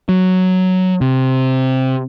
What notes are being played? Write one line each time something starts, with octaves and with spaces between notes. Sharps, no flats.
F#3
C3